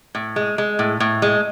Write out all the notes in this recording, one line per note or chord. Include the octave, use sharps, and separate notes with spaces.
A2
G#3
G#3
A2
A2
G#3